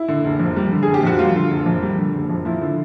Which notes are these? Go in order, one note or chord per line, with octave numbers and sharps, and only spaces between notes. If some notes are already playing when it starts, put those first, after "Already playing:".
Already playing: E4
D3
F#1
F2
G3
D3
F#1 G#4
G4
F2 F#4
G3 F4
D3
F#1
F2
G3
D3
F#1
F2
F3 E4
D3